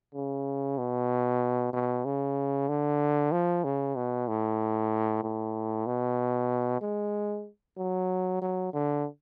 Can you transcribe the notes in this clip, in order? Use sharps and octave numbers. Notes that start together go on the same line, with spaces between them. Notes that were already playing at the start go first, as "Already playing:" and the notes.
C#3
B2
B2
C#3
D3
F3
C#3
B2
A2
A2
B2
G#3
F#3
F#3
D3